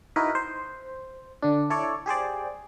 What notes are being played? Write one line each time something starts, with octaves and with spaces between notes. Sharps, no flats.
D#4 E4 F#4 A#4 B4
C5
D3 D4
E4 A4 C#5 D5
G4 G#4 C5 D5